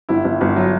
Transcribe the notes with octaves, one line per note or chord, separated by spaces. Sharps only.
G1 E4
G1
G1
F#3